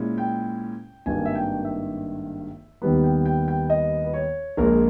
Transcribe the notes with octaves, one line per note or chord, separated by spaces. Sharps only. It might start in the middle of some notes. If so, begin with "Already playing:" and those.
Already playing: A#2 G#3 C#4 E4
G5
G#1 G2 D#3 A#3 G#5
E5
G5
E5
D#2 D#3 G3 B3 B4
G5
G5
G5
D#5
B4
C#5
A#1 A#2 G#3 A#4